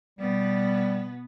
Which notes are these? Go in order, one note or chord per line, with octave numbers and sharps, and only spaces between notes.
B2 G3 B3